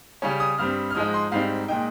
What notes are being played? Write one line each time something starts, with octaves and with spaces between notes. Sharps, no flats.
C#3 G3 C#4
D#6
G2 G3 C4 F6
F6
G#2 F3 G#3 D#4 D#6
C6
G#2 G3 C4 D#4 F5
A#2 G#3 D#4 G5